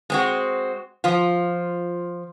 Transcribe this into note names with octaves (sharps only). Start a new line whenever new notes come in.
G#3 C4 F#4
F3 F4